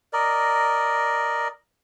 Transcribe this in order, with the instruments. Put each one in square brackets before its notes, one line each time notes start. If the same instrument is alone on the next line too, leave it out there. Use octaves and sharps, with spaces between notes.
[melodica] A#4 D5 D#5